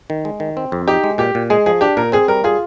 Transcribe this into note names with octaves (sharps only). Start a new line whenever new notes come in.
D#3
G#3
D#3
C4
F2
D#4 G4
G#3
A#2 G4
A#2
G#3 G#4
F3 G#4
D4 G4
A#2 A#4
C4 G#4
G3 A#4
F4 G#4